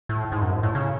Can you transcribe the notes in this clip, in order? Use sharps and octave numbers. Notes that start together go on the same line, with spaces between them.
A2
G#2
F#2
G#2
A2
C#3